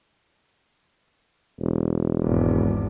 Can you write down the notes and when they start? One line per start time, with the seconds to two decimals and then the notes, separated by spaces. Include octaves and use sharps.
1.60 E1
2.23 G#1 E2